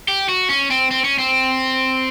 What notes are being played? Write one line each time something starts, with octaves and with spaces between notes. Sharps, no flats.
G4
F#4
C#4
C4
C4
C#4
C4